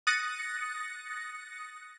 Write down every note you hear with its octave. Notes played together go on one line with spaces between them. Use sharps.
D#6 F#6 A6 A#6 C#7